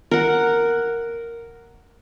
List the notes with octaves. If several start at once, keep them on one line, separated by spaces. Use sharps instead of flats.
A#4 F#5